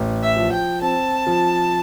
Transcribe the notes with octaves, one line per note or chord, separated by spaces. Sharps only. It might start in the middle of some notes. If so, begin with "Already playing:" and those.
Already playing: A1
E5
F3
G5
C4 A5
F3